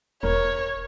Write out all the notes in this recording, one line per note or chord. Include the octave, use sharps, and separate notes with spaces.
E1 A#4 C#5